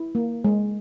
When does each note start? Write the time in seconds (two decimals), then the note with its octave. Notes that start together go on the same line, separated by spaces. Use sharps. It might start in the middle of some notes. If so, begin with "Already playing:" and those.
Already playing: E4
0.15 A#3
0.45 G#3